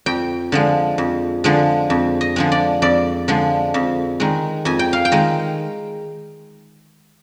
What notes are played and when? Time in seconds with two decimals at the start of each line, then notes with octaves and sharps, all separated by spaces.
0.06 F2 G5
0.52 D3 F3 G#3
0.98 F2
1.44 D3 F3 G#3
1.90 F2
2.21 D#5
2.36 D3 F3 G#3
2.52 D5
2.82 F2 D5
3.28 D3 F3 G#3
3.74 F2
4.20 D#3 G#3
4.65 F2 G#5
4.79 G5
4.93 F5
5.05 G5
5.12 D#3 G#3